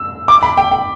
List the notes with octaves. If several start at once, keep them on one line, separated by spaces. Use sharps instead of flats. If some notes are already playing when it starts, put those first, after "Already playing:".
Already playing: E6
D6
B5
G5
G5